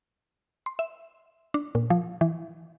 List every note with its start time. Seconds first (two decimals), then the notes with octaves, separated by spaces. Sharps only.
0.66 C6
0.79 E5
1.54 D4
1.75 A#2
1.90 F3
2.21 E3